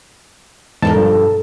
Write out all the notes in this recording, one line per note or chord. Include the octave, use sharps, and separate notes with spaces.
E2 G#2 B2 A4 A#4 A5
G2 F3